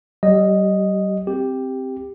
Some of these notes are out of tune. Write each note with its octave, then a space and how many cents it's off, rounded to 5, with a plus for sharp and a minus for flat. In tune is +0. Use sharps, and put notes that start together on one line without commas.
G3 -45 G4 -15 D#5 +0
C4 +0 G4 +0